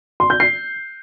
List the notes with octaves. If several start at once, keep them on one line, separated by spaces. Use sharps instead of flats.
C6
G6
C7